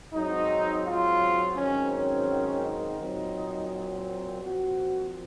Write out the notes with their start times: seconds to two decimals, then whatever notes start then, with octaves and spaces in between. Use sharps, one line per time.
0.13 G#2 F#3 C4 D#4
0.85 F4
1.56 G#2 D#3 F#3 C4 C#4
1.92 C#4
2.63 D#4
2.99 A#2 F#3 C4
4.42 A#2 F3 C4 F#4